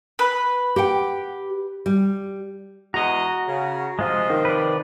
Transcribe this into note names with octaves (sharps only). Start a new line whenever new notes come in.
B4
G4 F#5 G5
G3
E2 G#3 F#4 D#5 A#5
C#3
C3 F3 G#3 F4 D#5
D#3
B4 D5